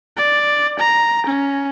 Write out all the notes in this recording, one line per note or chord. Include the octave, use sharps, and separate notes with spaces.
D5
A#5
C#4